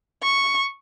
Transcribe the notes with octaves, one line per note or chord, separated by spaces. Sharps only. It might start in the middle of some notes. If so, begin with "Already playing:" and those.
C#6